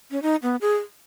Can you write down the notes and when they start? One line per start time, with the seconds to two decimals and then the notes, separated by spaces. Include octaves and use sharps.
0.11 C#4
0.23 D#4
0.42 B3
0.61 G#4